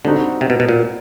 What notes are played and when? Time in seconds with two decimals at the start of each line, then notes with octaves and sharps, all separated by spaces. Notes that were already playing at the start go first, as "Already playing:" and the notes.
0.04 D3 G3 C4 D#4 F#4
0.41 C3
0.50 B2
0.60 B2
0.69 A#2